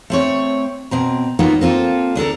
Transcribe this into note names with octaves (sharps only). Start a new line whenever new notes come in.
A3 C4 C#5
B2 C4 A#5
F#3 A#3 B3 D#4 F4
A#3 C4 F4 A4
D2 D4 A4 A#4